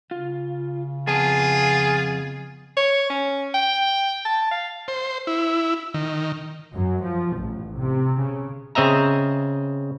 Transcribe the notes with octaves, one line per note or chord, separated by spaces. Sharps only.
C#3 F4
F2 B3 F4 G#4 A5
C#5
C#4
G5
A5
F5
C5
E4
D#3
F#2
F3
A1
C3
C#3
C#3 C4 D#5 E5 A#5